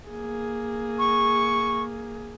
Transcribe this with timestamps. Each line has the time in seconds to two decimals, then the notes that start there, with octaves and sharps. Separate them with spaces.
0.10 A#3 G#4
0.98 C#6